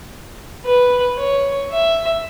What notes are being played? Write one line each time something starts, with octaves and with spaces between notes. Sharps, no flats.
B4
C#5
E5